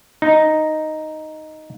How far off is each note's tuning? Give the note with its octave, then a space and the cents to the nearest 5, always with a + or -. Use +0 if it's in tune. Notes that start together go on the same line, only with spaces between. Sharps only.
D#4 +0